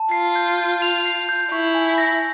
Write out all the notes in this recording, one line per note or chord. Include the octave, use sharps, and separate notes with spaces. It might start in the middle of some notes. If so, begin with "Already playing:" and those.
Already playing: A5
F4 C7
G6
G6
F7
C7
G6
E4 C#6
G#5
A#6